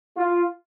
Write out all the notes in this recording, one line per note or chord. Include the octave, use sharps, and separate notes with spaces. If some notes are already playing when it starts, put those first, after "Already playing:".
F4